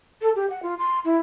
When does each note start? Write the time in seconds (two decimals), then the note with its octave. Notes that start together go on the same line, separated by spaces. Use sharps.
0.21 A4
0.35 G4
0.50 F#5
0.62 F4
0.79 C6
1.04 E4